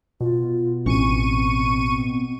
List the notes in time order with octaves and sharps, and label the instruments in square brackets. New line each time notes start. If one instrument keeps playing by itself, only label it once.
[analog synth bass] B2 [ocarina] F4
[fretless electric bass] A1 C#4 [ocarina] C4 [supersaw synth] C#6 D#7